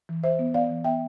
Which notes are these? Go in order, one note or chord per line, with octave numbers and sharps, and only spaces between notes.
E3
E3 C5 E5
B3
B3 D5 F5
E3
B3 E5 G5